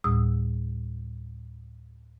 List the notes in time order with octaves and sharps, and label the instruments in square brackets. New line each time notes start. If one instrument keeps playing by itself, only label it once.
[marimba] D2 A2 G3 D#6 E6